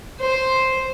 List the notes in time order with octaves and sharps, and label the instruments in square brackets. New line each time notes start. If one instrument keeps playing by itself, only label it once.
[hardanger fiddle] C5